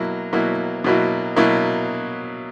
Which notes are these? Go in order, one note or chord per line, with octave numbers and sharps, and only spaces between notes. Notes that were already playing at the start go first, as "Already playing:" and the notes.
Already playing: B2 F#3 A#3 E4
B2 F#3 A#3 E4
B2 F#3 A#3 E4
B2 F#3 A#3 E4